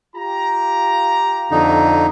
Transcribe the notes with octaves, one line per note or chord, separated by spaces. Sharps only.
F4 G4 A#5
F2 D3 D#4